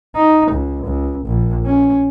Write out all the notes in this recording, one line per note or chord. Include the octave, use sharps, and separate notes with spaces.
D#4
C#2
C#2
A#1
C#4